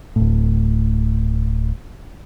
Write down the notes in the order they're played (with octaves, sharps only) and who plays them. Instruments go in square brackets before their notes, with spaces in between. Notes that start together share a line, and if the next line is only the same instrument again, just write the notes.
[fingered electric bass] D1 A2